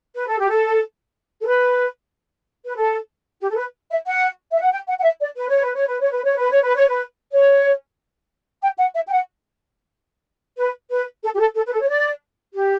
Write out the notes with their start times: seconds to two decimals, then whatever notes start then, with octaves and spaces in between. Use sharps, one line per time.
0.16 B4
0.27 A4
0.39 G4
0.50 A4
1.41 A4
1.46 B4
2.65 B4
2.76 A4
3.41 G4
3.50 A4
3.57 B4
3.91 E5
4.06 F#5
4.51 E5
4.60 F#5
4.71 G5
4.88 F#5
4.99 F#5
5.03 E5
5.20 D5
5.36 B4
5.49 C#5
5.62 B4
5.74 C#5
5.87 B4
6.00 C#5
6.11 B4
6.24 C#5
6.38 B4
6.50 C#5
6.62 B4
6.75 C#5
6.87 B4
7.31 C#5
8.63 G5
8.78 F#5
8.94 E5
9.07 G5
9.11 F#5
10.58 B4
10.91 B4
11.23 A4
11.35 G4
11.39 A4
11.55 A4
11.65 B4
11.72 A4
11.82 C#5
11.88 D5
12.54 G4